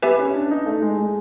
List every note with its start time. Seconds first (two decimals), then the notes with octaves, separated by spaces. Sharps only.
0.02 B3 G4 B4 E5 G#5
0.19 C#4
0.35 D4
0.51 D#4
0.66 A3
0.82 G#3
0.98 G#3